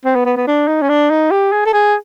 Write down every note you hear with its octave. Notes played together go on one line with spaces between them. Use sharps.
C4
B3
B3
B3
D4
D#4
C#4
D4
D#4
G4
G#4
A4
G#4